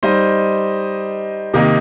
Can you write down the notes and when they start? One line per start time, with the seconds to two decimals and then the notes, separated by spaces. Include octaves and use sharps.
0.03 G3 D#4 C5 D#5
1.54 C3 D#3 A#3 D#4